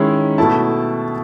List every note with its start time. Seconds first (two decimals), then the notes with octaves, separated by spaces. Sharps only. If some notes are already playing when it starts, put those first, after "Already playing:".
Already playing: D#3 G#3 C#4 E4
0.38 B2 A3 E4 A5